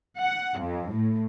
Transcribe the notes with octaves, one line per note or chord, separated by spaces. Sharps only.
F#5
F2
A2